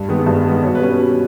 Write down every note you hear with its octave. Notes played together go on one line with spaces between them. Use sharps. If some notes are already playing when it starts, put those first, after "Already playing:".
Already playing: G2
D#3 G#3 B3
G2
D#3 G#3 B3
B2 C#5
B4
G3 C#4
B2